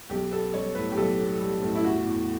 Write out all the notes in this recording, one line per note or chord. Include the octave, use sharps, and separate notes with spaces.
B1 G4
B3 A4
G3 C#5
A2 B4
G4
B1 A4
B3
G3
A2
E4
E2 F#4
E2